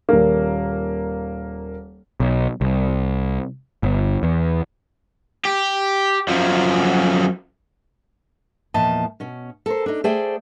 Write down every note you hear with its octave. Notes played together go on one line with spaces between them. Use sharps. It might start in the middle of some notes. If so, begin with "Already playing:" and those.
D#1 A#3
B1
C2
G1
E2
G4
F#2 F3
E2 A#2 F3 D#5 A5
B2 C#4
A4 A#4 C5
D4 D#4
A3 G#4 C5 D5 G5